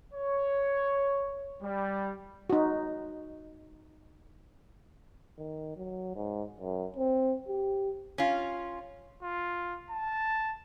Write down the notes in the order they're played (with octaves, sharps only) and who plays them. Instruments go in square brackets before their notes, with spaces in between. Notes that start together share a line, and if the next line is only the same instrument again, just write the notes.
[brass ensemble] C#5
G3
[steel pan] D#4 F#4
[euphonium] D#3
F#3
G#2
F#2
C4
G4
[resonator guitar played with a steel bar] C#4 F4
[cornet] F4
A5